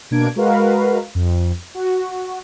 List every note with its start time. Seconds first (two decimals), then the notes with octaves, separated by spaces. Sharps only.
0.11 B2 A#3 D4 G#6 D7
0.36 G#3 F#4 A#4 B4 F5
1.15 F2
1.75 F#4